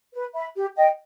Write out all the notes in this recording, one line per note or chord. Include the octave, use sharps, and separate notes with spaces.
B4
E5 B5
G4
D#5 G5